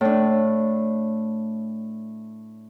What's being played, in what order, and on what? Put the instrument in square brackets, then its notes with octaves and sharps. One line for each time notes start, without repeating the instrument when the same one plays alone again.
[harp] A2 D4